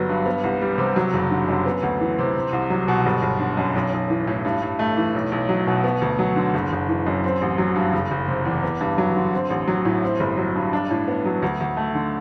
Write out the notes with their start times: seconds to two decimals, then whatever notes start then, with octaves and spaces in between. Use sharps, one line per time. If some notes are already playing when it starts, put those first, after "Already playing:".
Already playing: G1 F#3 B3
0.09 G2
0.26 B3
0.44 C2
0.61 G3
0.78 C3
0.96 F#3
1.13 F#1
1.31 D3
1.48 F#2
1.66 B3
1.83 D2
2.01 E3
2.18 C3
2.35 C4
2.53 C2
2.70 F#3
2.88 B2
3.06 G1
3.22 G1
3.40 D3
3.57 F#2
3.75 B1
3.93 B1
4.10 E3
4.27 A2
4.45 G2
4.62 G2
4.79 A3
4.97 E3
5.15 B1
5.32 B1
5.49 F#3
5.67 B2
5.84 B3
6.01 D2
6.19 F#3
6.36 D3
6.54 F#1
6.72 F#1
6.89 E3
7.07 F#2
7.24 C4
7.41 A1
7.58 F#3
7.75 G2
7.93 F#1
8.11 F#1
8.28 C3
8.45 E2
8.63 B3
8.80 G2
8.98 F#3
9.16 D3
9.33 C4
9.50 A1
9.68 F#3
9.85 A2
10.03 C4
10.20 G1
10.37 F#3
10.55 G2
10.73 D4
10.91 A2
11.08 B3
11.25 F#3
11.42 D2
11.60 D2
11.77 A3
11.95 D3